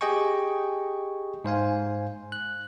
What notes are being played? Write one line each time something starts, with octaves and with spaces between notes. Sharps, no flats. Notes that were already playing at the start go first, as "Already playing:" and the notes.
G4 G#4 D#5 G5 G#5 C#6
G#2 C5 F5 G#5
F#6